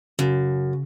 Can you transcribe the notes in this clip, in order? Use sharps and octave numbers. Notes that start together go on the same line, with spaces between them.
F#2 C#3